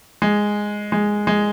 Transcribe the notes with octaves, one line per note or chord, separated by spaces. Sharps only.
G#3
G#3
G#3